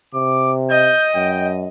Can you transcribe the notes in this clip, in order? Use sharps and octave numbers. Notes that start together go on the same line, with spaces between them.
C3 D6
D#5 G6
F#2 G5